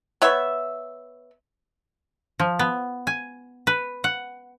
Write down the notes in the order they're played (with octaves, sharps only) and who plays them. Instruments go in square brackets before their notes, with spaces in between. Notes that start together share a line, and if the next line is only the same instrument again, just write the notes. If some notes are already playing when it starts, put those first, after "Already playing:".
[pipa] B3 C#5 E5
[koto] F3
B3
G#5
B4
F#5